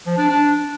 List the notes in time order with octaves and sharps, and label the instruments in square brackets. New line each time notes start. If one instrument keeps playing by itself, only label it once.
[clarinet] F3
D4
D4